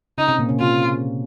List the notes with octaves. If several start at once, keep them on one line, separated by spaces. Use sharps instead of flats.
C#3 C#4 D#4
C3 C4
A#2 A#3
C#3 C#4
C3 C4 F4